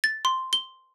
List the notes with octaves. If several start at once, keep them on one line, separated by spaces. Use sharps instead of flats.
A6
C6
G7